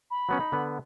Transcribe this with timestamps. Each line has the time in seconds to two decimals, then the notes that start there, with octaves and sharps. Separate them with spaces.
0.11 B5
0.29 F#3 B3 C#4
0.40 D#4
0.52 D3 B3